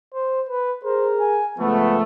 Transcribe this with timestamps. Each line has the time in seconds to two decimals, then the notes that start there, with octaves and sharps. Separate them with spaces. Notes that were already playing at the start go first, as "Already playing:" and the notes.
0.14 C5
0.49 B4
0.84 G#4 A#4 C5
1.20 G#5
1.58 C#2 F3 A3 B3